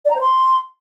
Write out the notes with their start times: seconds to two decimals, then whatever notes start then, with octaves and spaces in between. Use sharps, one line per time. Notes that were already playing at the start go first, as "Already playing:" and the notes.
0.05 D5
0.10 A#5
0.15 C5
0.21 C6